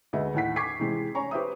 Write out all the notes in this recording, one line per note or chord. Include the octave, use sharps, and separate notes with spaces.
D2 G#3 B4 D#5 E5
D#2 A2 F#5 B6
C#6 D6 G#6 B6 C7
C3 E3 G#3 C4
C#5 G#5 A#5 C#6
G4 B4 C5 E5 D#6